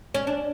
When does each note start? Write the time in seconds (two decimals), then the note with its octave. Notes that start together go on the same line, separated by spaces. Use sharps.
0.14 C#4
0.27 D4